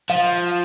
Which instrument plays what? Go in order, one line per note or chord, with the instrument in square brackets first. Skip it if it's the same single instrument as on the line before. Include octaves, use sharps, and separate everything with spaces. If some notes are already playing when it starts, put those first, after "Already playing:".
[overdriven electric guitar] F3 [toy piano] F5